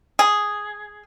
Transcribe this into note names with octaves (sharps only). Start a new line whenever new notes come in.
G#4